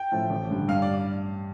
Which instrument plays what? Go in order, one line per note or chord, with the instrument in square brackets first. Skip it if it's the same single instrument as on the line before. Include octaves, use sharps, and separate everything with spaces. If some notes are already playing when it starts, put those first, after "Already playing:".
Already playing: [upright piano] G5
[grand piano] A2 F3 A3 E4
A1
G2 D3 G3
[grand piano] G2 [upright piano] F5
[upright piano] D5